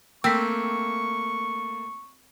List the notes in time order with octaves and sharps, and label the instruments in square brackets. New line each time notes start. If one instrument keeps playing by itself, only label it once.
[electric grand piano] A3 A#3 [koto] C4 [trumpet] C#6 [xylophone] E6 B6